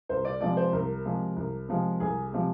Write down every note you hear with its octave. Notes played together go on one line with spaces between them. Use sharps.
C2 C5
D5
C3 F3 G#3 D5
C5
C2 A#4
C3 F3 G#3
C2
C3 F3 G#3
C2 G#4
C3 F3 G#3